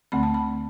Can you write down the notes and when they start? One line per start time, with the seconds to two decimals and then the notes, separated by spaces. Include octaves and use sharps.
0.12 D2 D3 A3 C4 B5
0.23 A5
0.34 B5